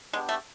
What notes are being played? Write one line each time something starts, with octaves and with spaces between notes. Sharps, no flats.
G#3 B3 D4 G4
A3